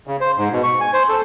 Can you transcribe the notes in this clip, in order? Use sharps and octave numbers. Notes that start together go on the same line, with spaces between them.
C#3
C5
G#2
B2
C#6
G#5
C5
A4